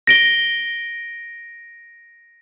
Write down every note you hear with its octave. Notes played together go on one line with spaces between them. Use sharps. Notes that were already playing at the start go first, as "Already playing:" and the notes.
A#6 D7 G7